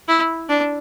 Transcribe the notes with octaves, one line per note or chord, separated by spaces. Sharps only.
E4
D4